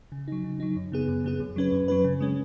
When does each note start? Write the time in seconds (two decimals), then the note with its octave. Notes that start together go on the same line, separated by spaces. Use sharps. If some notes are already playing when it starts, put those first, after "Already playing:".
0.12 C#3
0.28 F#3 D#4
0.44 C#3
0.60 F#3 D#4
0.76 F#2
0.92 C#3 B3 G#4
1.08 F#2
1.24 C#3 B3 G#4
1.40 F#2
1.56 F#3 C#4 B4
1.72 F#2
1.88 F#3 C#4 B4
2.04 C#3
2.20 G#3 C#4